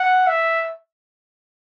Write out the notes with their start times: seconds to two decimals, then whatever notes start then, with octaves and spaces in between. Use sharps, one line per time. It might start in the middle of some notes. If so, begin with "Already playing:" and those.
Already playing: F#5
0.27 E5